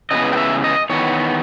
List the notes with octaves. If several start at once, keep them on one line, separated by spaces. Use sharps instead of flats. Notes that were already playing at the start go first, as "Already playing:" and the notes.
C#3 E3 G#3 B3 D#5
G5
E5
D#5
E2 D#3 B3 C#5